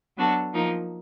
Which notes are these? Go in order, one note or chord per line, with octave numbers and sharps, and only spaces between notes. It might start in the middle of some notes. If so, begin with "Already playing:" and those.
F#3 B3 D4 F#4 A4
F3 A#3 D#4